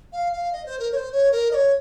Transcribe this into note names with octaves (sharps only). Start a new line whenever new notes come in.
F5
F5
D#5
C5
A#4
C#5
C5
C#5
A#4
D#5
C#5